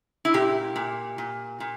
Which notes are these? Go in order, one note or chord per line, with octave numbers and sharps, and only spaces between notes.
E4
A#2 G4
A#2
A#2
A#2